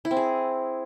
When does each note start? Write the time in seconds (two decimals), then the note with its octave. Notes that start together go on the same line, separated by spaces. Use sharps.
0.05 E4
0.11 C4
0.17 G#4